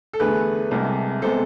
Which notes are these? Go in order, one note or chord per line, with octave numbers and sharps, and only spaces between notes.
A4
E2 D3 A3 G#4 B4
C2 C3 G#3
C3 G#3 B3 A4 C5